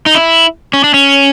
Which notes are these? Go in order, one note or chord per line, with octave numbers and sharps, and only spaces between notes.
D#4
E4
C#4
D4
C#4